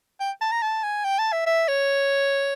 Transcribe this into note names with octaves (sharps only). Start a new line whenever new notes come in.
G5
A5
A#5
A5
G#5
G5
A5
E5
E5
C#5